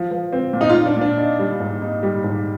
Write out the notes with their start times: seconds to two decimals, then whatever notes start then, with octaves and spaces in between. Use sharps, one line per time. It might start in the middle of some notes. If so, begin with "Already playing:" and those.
Already playing: F3
0.11 F3
0.33 C4
0.53 A#2
0.61 D#4
0.69 F4
0.75 A#2
0.86 D4
0.97 A#2 D4
1.18 D#4
1.39 G3
1.60 G#2
1.82 D#4
2.03 G3
2.24 G#2